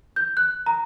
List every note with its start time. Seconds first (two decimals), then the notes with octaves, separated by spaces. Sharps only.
0.16 G6
0.37 F#6
0.66 A#5